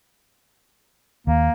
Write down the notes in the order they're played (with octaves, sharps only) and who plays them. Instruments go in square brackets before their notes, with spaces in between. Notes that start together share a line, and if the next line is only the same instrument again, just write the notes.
[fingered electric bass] D#2 [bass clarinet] A#3